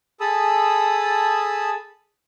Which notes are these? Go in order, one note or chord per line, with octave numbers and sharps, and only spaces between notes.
G#4 A4 A5 B5 D#6 E6